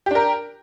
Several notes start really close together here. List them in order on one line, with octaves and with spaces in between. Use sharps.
G4 D4 A#4